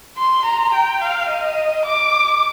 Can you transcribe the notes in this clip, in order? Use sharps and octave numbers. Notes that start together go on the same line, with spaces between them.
C6
A#5
G5
F5
D#5
D6